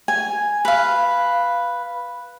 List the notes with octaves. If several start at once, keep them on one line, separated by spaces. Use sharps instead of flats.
G#5
B4 F5